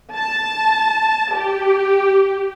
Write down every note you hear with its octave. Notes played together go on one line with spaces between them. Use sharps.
A5
G4